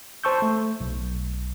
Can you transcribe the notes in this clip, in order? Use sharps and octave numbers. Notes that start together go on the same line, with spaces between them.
C5 A5 C#6 E6 G6
A3
B1